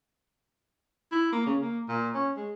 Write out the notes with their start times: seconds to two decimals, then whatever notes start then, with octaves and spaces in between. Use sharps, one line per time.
1.12 E4
1.32 A#3
1.46 C#3
1.61 A#3
1.88 A#2
2.14 C#4
2.37 G#3